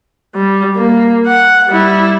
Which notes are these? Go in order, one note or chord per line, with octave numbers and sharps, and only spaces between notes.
G3
A#3
F#5
G3 E4